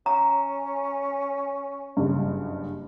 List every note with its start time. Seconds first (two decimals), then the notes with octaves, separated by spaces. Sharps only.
0.06 C#4 A#5
1.97 F#1 G2